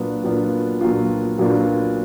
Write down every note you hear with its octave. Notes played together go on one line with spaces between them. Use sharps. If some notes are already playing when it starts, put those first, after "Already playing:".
Already playing: A#2 F#3 B3 D4 F4
A#2 F#3 B3 D4 F4
A#2 F#3 B3 D4 F4
A#2 F#3 B3 D4 F4